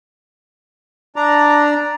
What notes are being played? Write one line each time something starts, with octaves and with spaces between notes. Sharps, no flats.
D4 D5 A#5